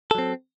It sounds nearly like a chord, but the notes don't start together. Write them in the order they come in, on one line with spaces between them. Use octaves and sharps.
A4 F#3 C4